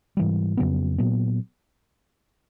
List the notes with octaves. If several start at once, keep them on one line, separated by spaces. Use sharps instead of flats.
G#2 E3 G3
F2 C#3 F#3 B3
A#2 F#3 B3